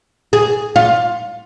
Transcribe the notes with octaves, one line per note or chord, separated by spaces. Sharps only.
G#4
F4